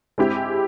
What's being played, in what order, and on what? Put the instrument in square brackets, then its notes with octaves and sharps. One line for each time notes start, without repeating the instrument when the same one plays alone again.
[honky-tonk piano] G#3 C4 E4 G4